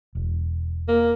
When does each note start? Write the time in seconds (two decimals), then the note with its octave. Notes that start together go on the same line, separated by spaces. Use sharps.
0.15 E1
0.88 A#3